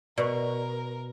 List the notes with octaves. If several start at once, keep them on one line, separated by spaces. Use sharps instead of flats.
B2 A#4 D5 C#6